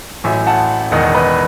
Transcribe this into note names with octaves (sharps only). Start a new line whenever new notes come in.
A1 A2 F#3 E5 G#5
F#5 A5
E1 E2 D#3 D#5 F#5
B4 D#5